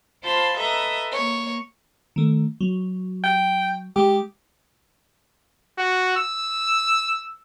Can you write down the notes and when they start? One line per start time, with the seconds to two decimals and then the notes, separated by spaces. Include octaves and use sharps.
0.23 F4 C5 A5 B5 C6
0.57 A4 B4 D#5 E5 A#5
1.11 A#3 C#5
2.16 D#3 A3
2.61 F#3
3.24 G5
3.96 G#3 G4 D6
5.78 F#4
6.17 E6